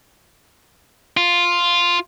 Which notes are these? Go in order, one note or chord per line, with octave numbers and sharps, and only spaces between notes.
F4